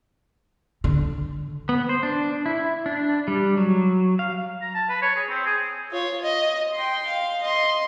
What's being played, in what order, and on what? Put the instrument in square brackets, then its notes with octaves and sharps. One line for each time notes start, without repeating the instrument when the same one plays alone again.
[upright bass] D3
[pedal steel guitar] B3
C5
D4
E4
D4
G3
F#3
F5
[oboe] A#5
A5
B4
C#5
G#4
C4
G#4
[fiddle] F4 C#5
D#5
G5 C6
F5
D#5 C6